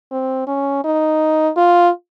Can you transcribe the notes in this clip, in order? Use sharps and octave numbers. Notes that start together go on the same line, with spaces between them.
C4
C#4
D#4
F4